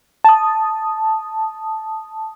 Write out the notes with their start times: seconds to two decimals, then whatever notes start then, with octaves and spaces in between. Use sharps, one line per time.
0.24 A5 D#6